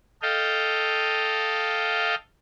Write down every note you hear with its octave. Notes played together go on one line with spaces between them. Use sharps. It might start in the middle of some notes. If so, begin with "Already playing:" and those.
A4 D#5 F5 G5